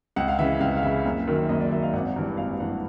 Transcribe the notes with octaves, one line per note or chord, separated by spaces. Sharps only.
C#2 F#5
F5
C#3 E3 E5
C#2 F5
F5
C#3 E3 E5
F#1
F#2 D#3
F#1 D#5
D5
F#2 D#3 E5
F5
G#1 F#5
G2 E3
G#1 F5
G2 E3 F#5